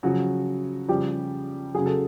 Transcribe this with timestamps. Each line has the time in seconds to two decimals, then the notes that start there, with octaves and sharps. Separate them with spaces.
0.03 C#3 F3 F#3 F#4
0.88 C#3 F3 G3 G4
1.74 C#3 F#3 G#4
1.86 A4